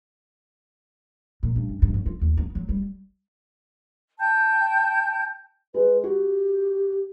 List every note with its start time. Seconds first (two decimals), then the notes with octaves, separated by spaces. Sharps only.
1.43 A#2
1.56 G2
1.69 F#2
1.82 G2
1.94 F#3
2.06 F4
2.21 D#2
2.37 B3
2.55 F#3
2.69 G3
4.19 G5 A5 G6
5.74 G#3 B4
6.04 F#4 G4